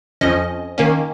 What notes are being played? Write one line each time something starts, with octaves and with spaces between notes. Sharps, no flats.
F2 F3 C#4 D#5
D#3 A#3 C#4